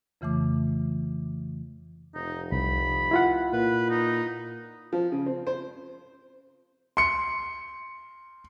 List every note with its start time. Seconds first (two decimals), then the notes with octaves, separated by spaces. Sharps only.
0.21 F2 C#3 E3 A3 D6
2.14 F1 D#4
2.52 C2 B5
3.11 E4 F4 F#5
3.53 A#2 B4
3.90 D#4
4.93 F3
5.12 C#3
5.26 C4
5.47 C5
6.97 C6 C#7